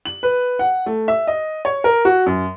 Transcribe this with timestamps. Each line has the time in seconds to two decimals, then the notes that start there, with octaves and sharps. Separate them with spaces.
0.05 F#7
0.23 B4
0.59 F#5
0.86 A3
1.08 E5
1.27 D#5
1.65 C#5
1.84 A#4
2.05 F#4
2.26 F#2